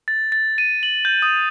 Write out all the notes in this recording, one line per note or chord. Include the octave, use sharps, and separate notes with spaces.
A6
A6
D#7
F#7
G6
D#6